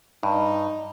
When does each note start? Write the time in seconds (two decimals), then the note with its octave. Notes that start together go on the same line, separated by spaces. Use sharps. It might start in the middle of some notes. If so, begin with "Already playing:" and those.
0.23 G2 D#4